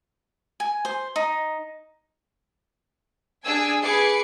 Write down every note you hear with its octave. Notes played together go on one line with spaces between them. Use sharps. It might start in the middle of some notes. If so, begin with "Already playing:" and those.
G#5
C5
D#4
D4 G#4 G#5 E6
G#4 B4 G#5 D6 C7 C#7